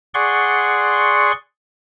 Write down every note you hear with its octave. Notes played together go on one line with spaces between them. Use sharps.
G#4 D5 F#5 C6 C#6